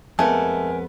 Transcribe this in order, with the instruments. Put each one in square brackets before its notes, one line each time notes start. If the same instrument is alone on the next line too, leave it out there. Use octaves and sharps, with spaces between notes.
[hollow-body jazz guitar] F2 G#3 B3 [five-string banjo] A3 [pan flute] A#4 [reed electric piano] G#5